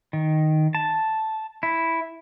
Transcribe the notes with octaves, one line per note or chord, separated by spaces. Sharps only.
D#3
A5
E4